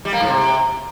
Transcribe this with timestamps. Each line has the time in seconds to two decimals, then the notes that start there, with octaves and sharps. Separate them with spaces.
0.05 G3
0.13 A#3
0.20 G#2
0.28 C3